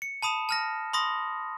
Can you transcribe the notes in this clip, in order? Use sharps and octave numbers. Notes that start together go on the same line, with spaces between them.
C#7
A5 B5 D#6 E7
A5 F6 A#6
B5 C6 D#6 A#6